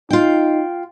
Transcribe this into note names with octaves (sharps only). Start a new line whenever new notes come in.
D#4 F4 G5